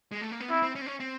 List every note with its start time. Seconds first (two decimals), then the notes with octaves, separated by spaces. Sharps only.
0.12 G#3
0.21 A3
0.31 A#3
0.40 B3
0.50 C4 E4
0.62 C4
0.75 C#4
0.81 C4
0.86 C#4
1.00 C4